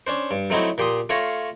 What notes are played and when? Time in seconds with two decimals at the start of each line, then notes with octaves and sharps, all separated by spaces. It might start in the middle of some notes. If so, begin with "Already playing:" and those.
0.07 C#4 D4 C5
0.31 G2
0.50 F#3 A3 C4 D#4 E4
0.78 A#2 G4 C6 D#6
1.09 A3 F4 C#5 F5 A#5